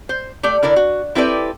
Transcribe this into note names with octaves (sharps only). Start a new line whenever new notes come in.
C5
A3 G4 D5
D3 E4 A#4 D5
F#4
C4 E4 G4 A4 B4 D5